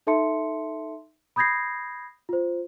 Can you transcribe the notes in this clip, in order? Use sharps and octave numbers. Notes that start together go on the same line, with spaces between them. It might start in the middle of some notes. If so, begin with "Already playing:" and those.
D#4 A4 E5 A5 C6 C#7
B5 D#6 G6 G#6 A#6 C7
F4 C5